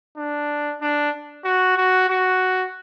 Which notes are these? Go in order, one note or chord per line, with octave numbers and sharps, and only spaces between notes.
D4
D4
F#4
F#4
F#4